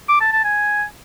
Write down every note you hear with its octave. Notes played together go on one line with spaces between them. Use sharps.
D6
A5
A5
G#5